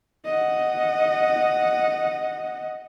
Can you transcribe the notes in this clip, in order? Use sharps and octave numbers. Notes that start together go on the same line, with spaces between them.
D#5 F#5